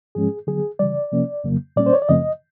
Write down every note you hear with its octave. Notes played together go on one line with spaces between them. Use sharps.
G#2 F3 G#3 C#4 G#4
D3 F#3 B3 G#4
C#3 E3 G3 D5
C3 F3 A#3 C#4
F2 C#3 F#3 A#3
A#2 G3 A#3 C#4 D5
C5
C#5
D5
F#2 C#3 F3 A3 C4 D#5